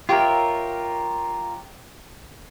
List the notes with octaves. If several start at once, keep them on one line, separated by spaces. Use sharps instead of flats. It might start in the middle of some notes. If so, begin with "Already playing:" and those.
F4 G4 A#4 C#5 E5